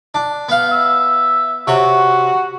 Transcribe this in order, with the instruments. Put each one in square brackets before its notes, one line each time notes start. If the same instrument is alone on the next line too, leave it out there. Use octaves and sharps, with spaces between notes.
[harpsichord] D4
B3 F5
[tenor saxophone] E5
[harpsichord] C3 C#5 [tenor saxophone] F#4